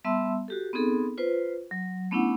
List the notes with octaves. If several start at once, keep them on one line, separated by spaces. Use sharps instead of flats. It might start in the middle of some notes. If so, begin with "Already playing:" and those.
G3 B3 E5 A5 C6 E6
F#4 G4 A4
B3 C4 D#4 G#4 A4
F4 B4 C5
F#3
A3 B3 C#4 D4 E4 F#5